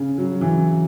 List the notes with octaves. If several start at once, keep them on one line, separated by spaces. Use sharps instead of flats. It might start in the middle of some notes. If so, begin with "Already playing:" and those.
Already playing: C#3
F#3
E3